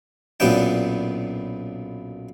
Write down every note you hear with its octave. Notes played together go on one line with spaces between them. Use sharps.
B1 F#2 A#2 B3 D4 G5